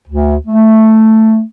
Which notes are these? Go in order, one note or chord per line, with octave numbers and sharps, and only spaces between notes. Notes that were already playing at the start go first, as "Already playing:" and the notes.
D2
A3